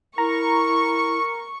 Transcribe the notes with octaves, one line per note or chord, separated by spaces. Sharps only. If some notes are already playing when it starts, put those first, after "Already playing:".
E4 A#4 A#5 C#6